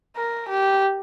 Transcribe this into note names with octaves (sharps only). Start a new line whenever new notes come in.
A#4
G4